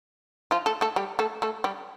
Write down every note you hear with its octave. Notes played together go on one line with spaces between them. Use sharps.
F3 F4
A3 A4
A3 A4
G3 G4
A3 A4
A3 A4
G3 G4